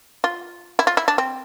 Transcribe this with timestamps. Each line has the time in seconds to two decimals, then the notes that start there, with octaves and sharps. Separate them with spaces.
0.24 F4
0.79 E4
0.87 F4
0.97 E4
1.08 D4
1.18 C4